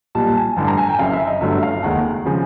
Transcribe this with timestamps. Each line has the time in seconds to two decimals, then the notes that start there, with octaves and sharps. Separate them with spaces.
0.15 B1 A#2 G3 A5
0.36 G#5
0.56 A1 G2 D3 A5
0.67 A#5
0.77 G#5
0.89 G5
0.99 F#1 F#2 C#3 F5
1.13 E5
1.27 D#5
1.41 G1 G2 D3 F#3 A3 E5
1.63 F5
1.83 F1 D#2 D#3 G#3 F#5
2.26 C#3 F3 G#3